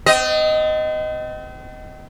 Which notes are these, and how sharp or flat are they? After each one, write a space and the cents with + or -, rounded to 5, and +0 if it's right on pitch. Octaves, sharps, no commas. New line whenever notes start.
C4 -40 D#5 +0